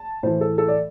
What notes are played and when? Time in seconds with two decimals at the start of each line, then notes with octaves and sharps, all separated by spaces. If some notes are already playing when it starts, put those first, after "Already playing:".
Already playing: A5
0.23 A2 E3 C5
0.41 A4
0.58 A4
0.68 D5